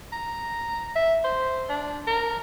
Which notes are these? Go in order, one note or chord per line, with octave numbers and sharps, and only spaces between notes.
A#5
E5
C5
D4
A#4